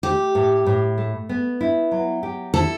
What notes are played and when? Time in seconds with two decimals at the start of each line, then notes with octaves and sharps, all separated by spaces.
0.03 A3 G4
0.35 A2
0.66 A2
0.98 A3
1.29 B3
1.61 E4
1.91 F#3
2.23 G4
2.54 E4 A4